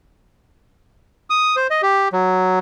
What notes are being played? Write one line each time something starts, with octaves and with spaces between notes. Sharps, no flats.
D#6
C5
D#5
G4
F#3